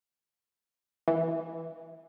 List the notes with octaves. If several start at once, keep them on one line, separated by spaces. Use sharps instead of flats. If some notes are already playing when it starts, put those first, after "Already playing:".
E3